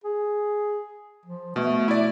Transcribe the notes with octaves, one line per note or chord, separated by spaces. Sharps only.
G#4
F3
B2 A3
E4 D5